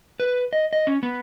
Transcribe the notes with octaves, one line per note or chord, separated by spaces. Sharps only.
B4
D#5
D#5
C#4
B3